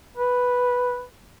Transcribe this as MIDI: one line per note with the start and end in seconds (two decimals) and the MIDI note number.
0.17 1.03 71